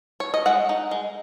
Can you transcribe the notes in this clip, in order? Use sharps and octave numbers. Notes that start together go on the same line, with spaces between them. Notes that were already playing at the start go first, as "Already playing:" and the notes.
C#5
D#5
G#3 F#5
D#4
G#3